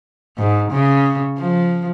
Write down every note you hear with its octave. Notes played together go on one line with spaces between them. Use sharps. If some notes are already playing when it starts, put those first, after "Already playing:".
G#2
C#3
F3